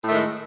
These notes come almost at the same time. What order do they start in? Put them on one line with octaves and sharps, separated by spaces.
A2 A3 D#3 G#3